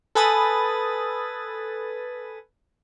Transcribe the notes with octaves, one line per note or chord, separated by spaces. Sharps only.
A4 B4 G#5 B5 D#6 A6